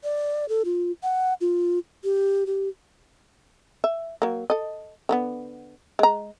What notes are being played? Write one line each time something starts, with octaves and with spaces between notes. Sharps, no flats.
D5
A4
F4
F#5
F4
G4
G4
E5
F#3 A#3
A4 D#5
D3 A#3 B3
G#3 A#5